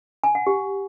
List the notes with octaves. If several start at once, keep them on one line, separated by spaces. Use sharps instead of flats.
G#5
F#5
G4